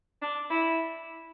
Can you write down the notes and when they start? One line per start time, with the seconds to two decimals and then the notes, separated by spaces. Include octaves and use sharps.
0.21 D4
0.49 E4